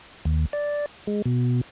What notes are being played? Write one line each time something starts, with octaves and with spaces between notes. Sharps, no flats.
D#2
D5
G#3
B2